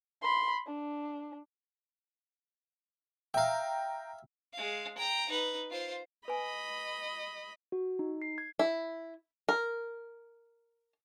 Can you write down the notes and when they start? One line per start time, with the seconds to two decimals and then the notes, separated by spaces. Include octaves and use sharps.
0.22 B5 C6
0.66 D4
3.34 E5 F5 G5 A#5
4.53 G#3 F5
4.97 G5 A#5
5.29 D#4 B4
5.70 F4 C5
6.28 B4 D#5 G#5 B5
7.72 F#4
7.99 D#4
8.22 C7
8.38 G#6
8.59 E4
9.49 A#4